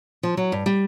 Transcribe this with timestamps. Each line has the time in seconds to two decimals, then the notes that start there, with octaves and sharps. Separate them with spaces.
0.23 F3
0.37 F#3
0.52 G2
0.66 G3